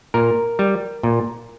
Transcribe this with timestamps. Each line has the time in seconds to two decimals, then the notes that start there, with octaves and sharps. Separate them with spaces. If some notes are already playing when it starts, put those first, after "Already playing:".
0.14 A#2 A#4
0.59 G3
1.03 A#2